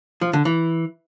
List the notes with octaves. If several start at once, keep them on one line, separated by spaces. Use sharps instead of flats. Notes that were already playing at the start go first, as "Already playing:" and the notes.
F3
D3
E3